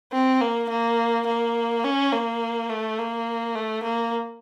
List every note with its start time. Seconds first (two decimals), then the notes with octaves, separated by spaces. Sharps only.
0.13 C4
0.41 A#3
0.70 A#3
1.27 A#3
1.84 C#4
2.12 A#3
2.69 A3
2.99 A#3
3.55 A3
3.84 A#3